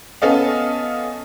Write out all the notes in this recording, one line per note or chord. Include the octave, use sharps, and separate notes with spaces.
B3 C#4 A4 D#5 F5